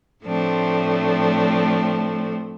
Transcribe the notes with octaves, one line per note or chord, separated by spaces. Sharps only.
A2 F3 A3 C4 D4